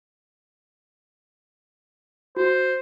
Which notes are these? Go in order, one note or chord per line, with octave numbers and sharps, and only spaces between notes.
F#4 C5